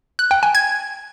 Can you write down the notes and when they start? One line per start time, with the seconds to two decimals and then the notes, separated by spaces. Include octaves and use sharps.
0.19 F#6
0.31 G5
0.43 G#5
0.55 G#6